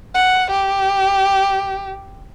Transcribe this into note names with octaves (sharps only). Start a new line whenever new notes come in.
F#5
G4